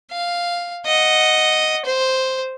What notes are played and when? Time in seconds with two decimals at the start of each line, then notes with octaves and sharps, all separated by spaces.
0.12 F5
0.86 D#5 F#5
1.86 C5